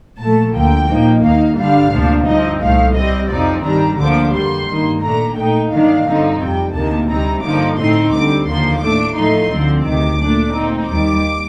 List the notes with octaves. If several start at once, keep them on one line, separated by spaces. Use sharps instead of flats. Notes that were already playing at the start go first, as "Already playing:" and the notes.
A#2 F3 A3 A5
D2 D3 F3 A#3 G5
A#2 F3 A#3 D#4
D#2 D#3 A#3 D#4 F5
G2 D3 G3 D4 F5
D2 C3 F3 A#3 D4
G2 F3 C4 D#4 D#5
C2 A#2 F3 A3 F5
C3 G3 C4 D#5
F2 C3 F3 C4 D#4 D5
G2 D#3 G3 D4 A#5
D2 D3 F3 A#3 D4 D6
F2 D3 G3 A#3 C6
G2 D#3 A#3 D#4
A#2 A3 D4 A#5
A#2 A3 D#4 G5
G2 D#3 A#3 D4 F5
G2 D3 F3 C4 D#4
F2 C3 G3 G5
D2 C3 D#3 A#3 A5
D2 C3 G3 C4 D#4 A#5
G2 D3 F3 A#3 D#4 D6
A2 A3 C4 D#4 C6
D2 D3 G3 C4 D6
D#2 D3 F3 A#3 C6
A2 A3 D4 D6
A2 F3 A3 D#4 C6
D2 D3 F3 C4
D2 C3 D#3 D6
A#2 A3 D4
A#2 A3 C4 D#4
D#2 D#3 G3 D6